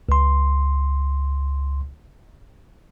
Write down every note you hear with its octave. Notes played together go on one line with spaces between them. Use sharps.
C#2 C6